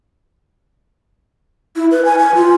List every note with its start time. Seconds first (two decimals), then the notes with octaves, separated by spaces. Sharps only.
1.76 E4
1.91 B4
2.05 G#5
2.19 G#5
2.35 F4